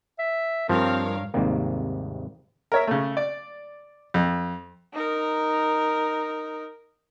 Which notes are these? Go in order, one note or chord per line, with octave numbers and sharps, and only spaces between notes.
E5
G2 F3 C4 A#4 C#5 F5
G#1 D#2 G#2 C3 G3 A#3
A#4 C#5 E5
C#3 A3
D5
F2
D#4 A#4